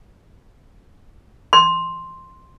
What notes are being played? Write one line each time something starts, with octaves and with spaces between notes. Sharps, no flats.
C6